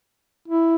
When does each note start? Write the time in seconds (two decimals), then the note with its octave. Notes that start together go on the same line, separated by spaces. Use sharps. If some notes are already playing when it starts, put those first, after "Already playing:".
0.48 E4